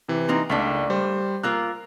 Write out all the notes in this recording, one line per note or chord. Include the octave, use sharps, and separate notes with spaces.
C3 E3
A#3 C4 D#4
C#2 A3 A#3 D4 B6
G3 C5
A#3 F4 A#4 E6 F#6